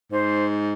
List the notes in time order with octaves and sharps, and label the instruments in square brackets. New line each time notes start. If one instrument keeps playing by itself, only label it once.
[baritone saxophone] G#2 [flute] C5